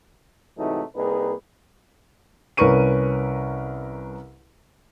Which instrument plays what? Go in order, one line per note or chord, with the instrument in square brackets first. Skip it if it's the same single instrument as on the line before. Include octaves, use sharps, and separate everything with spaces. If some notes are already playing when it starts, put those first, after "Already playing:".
[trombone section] G#2 C3 E3 F#3 A3 D#4
C2 A#3 D#4 G#4 B4
[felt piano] C2 C#4 A#4 B4 C#6 D#7